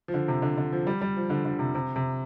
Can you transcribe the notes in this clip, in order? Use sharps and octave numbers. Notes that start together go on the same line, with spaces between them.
F3
D3
C3
D3
D3
F3
G3
G3
F3
D3
D3
C3
C3
C3